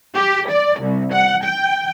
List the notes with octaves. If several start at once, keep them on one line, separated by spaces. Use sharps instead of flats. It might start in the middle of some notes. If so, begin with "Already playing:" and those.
G4
D5
C2
F#5
G5